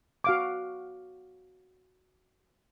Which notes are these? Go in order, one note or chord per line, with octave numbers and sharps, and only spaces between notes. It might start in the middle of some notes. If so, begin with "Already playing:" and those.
F#4 F5 D6